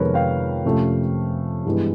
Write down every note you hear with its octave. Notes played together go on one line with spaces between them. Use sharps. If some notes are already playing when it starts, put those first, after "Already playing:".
Already playing: F2 C3 D#3 G#3 B3 A#4 B4 C#5
F5 G5
F2 C3 F3 A3 C#4
G2 E3 G#3 B3